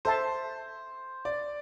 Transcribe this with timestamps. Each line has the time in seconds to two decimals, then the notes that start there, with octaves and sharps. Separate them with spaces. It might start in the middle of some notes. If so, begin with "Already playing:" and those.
0.05 A4 C5 E5 A5 C6
1.25 D5